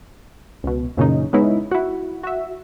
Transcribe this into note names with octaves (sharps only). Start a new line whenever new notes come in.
C#2 B2
F#2 A#2 C#3 E3 C#4 D#4
G#3 B3 C#4 D#4 E4
E4 F#4
F#4 E5